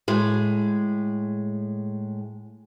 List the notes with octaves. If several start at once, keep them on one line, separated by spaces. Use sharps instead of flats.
A2 G#3